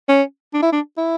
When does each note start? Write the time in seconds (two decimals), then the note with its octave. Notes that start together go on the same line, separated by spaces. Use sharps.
0.09 C#4
0.54 D4
0.62 E4
0.73 D4
0.98 E4